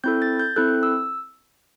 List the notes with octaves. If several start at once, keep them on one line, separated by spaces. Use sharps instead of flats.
C4 E4 A4 G6
A6
G6
C4 E4 A4 F#6
E6